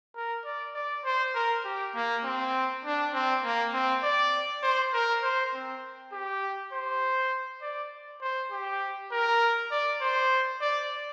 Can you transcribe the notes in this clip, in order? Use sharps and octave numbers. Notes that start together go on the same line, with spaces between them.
A#4
D5
D5
C5
A#4
G4
A#3
C4
D4
C4
A#3
C4
D5
C5
A#4
C5
C4
G4
C5
D5
C5
G4
A#4
D5
C5
D5